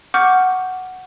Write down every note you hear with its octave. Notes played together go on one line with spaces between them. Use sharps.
F#5 C#6 D6 F6 G6